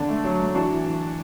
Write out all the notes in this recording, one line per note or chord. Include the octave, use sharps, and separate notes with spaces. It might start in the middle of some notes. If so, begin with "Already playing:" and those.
Already playing: D3 D4
A3
F#3
A3
E3 D4 F#4
E3
E3